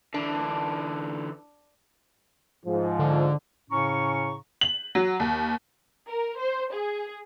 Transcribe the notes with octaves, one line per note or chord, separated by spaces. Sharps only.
D3 E3 D4
G#2 F3
D3
A2 C#3 C#4 A#5 C#6
F#7
F#3
D#2
A#4
C5
G#4